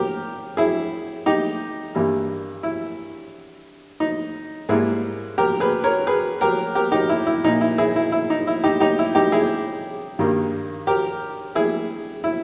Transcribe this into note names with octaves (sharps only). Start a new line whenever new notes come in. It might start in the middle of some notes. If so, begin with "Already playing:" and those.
Already playing: G4 A#4
E4 G#4
D#4 G4
G2 E3 G3 A#3
E4
D#4
G#2 G3 A#3 E4 G#4
G4 A#4
G#4 B4
A#4 C#5
G#4 B4
G4 A#4
G4 A#4
D#4 G4
E4
E4
A#2 A#3 D#4
E4
E4 G#4
E4
E4
D#4
E4
D#4 G4
D#4 G4
E4
D#4 G4
E4 G#4
G2 D#3 G3 A#3
G4 A#4
E4 G#4
E4